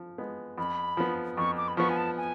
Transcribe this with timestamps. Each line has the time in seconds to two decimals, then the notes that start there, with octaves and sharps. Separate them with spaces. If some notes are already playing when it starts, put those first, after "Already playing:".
Already playing: F3
0.18 G#3 B3
0.58 F2 B5
0.97 F3 B3
1.37 F2 C#6
1.57 D6
1.68 B5
1.77 F3 B3 C#6
1.89 G#5
1.97 A5
2.17 G#5